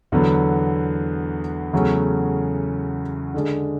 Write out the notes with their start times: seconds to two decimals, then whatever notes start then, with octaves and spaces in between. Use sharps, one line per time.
0.12 E2 D3 F#3 B3
1.73 E2 C#3 F#3 A3 C#4
3.34 D3 G#3 D4